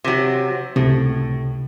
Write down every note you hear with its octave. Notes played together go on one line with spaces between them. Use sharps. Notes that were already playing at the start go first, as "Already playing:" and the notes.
C3 F#3
C#2 A2 C3